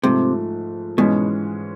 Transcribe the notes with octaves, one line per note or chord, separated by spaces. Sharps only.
G#2 C3 F3 A3
G#2 B2 E3 G#3 C#4